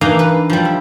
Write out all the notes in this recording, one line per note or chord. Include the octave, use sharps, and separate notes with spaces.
E3 A#3 D4 D#4 F5 G#5
B4
F3 G3
E4